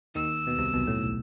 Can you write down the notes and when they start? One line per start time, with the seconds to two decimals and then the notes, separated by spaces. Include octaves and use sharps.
0.15 D#2 D#3 E6
0.47 B2
0.58 C2 C3
0.73 B1 B2
0.87 A2